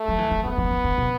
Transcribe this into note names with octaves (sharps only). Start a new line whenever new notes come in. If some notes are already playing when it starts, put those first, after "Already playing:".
Already playing: A3
F#3
E3
E3
F#3 B3
E3
E3
D3
B2